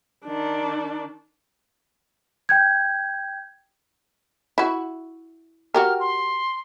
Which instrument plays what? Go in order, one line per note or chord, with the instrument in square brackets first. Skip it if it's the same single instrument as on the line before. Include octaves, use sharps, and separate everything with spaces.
[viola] D#3 D4
[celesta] G5 G6 G#6
[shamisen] E4 F#4
[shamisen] F#4 G4 A#4 [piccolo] F6
[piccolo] C6